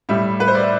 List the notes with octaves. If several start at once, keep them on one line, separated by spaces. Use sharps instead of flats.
A2 G3 E5
B4
C5
D5
E5